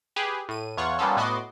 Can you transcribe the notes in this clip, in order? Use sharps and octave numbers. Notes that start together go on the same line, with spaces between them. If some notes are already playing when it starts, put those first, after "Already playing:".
G4 G#4 B4
A2 D#7
E2 F4 C#5 F#5 C#6
G3 A#3 B3 C#4 F4 A4
A2 B3 F#4 D#5 C6 D6